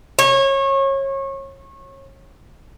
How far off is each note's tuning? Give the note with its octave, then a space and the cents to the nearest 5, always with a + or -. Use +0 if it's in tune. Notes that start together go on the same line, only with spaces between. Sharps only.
C#5 -25